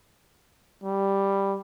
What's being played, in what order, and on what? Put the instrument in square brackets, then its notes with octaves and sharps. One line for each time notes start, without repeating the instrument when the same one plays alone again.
[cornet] G3